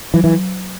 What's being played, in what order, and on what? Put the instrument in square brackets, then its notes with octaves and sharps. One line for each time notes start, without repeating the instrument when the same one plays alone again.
[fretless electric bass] E3 [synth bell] F#3
[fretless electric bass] E3